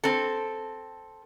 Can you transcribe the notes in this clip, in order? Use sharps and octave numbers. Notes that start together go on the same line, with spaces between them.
C4 A4